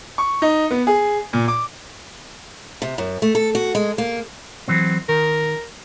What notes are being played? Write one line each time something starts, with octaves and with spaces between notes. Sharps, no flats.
C#6
D#4
B3
G#4
A#2
D6
C3
F#2
A3
A4
F#4
G#3
A#3
E3 F#3 C4
D#3 A#4